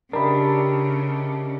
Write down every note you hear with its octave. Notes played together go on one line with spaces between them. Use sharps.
C#3 D4 D#4 G4 A#4 E5 B5